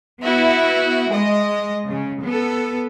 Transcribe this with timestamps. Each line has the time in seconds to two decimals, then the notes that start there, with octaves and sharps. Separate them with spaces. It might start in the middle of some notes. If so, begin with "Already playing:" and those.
0.22 B3 E4 F#4
1.11 G#3 D#5
1.87 C#3
2.23 B3 A4